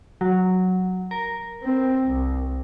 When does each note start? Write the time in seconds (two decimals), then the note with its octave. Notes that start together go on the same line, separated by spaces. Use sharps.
0.21 F#3
1.11 A#4
1.63 C4
2.06 C2